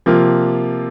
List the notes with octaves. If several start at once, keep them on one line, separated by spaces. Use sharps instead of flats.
C3 F3 A#3 F4